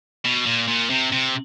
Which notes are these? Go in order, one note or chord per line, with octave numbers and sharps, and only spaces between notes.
B2
A#2
A#2
C3
C3